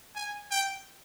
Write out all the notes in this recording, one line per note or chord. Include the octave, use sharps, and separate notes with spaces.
G#5
G5